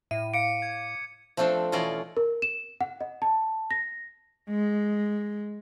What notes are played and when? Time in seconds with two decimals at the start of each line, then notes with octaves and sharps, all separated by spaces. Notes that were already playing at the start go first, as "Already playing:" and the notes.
0.11 A2 E5 D#7
0.34 F5 D6 C#7 D7
0.62 G#6
1.37 F3 A3 C4 D4 A4
1.72 B2 E3 C#4 F4 D5 D#5
2.17 A#4
2.42 E7
2.81 F#5
3.01 D#5
3.22 A5
3.71 A#6
4.50 G#3